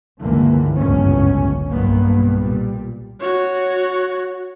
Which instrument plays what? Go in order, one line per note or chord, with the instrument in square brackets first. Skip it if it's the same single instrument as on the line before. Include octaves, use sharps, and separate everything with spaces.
[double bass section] C#2 G2 D3 E3 A#3
G1 C#2 F#2 A2 C#4
B1 G2 A#3 B3
A#2 G3
[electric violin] F#4 C#5